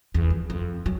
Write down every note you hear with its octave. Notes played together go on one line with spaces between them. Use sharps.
E2
F3
F2
F#3